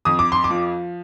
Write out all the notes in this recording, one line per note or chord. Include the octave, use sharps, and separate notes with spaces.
F2 D#6
D6
C6
D6
F3